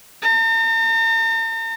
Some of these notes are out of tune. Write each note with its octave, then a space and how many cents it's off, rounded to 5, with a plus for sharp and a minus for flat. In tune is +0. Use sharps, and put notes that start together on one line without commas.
A#5 -45